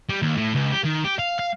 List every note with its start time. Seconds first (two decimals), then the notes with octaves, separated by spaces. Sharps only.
0.10 G3
0.22 D#2
0.36 A2
0.54 C#2
0.71 G4
0.84 D#3
1.04 G4
1.19 F5
1.39 F5